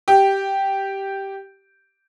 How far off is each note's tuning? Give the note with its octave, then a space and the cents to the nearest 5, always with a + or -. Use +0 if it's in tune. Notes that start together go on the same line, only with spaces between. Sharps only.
G4 -5